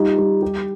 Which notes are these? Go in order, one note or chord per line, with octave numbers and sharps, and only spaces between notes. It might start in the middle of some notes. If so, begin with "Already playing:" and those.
Already playing: G3 D#4 F4
G3
G4